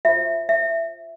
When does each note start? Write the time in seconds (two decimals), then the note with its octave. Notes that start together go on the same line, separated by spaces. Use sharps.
0.05 F4 C5 E5
0.49 E5